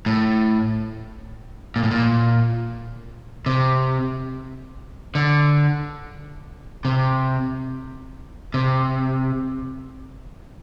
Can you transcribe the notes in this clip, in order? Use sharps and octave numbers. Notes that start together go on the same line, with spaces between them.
A2
A#2
A2
A#2
C3
D3
C3
C3